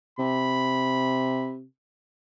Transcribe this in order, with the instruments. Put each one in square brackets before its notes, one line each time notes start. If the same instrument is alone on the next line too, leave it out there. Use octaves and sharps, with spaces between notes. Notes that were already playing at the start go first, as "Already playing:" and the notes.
[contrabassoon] C3 [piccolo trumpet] B5